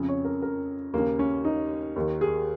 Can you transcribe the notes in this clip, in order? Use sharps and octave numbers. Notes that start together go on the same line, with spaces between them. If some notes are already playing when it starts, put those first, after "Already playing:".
Already playing: F2 C#3
C#5
A#4
A#4
D#2 C#3 A#3
C#4
D#4
D#2 D#3
G#4